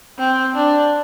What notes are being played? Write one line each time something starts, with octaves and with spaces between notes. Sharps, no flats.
C4
D4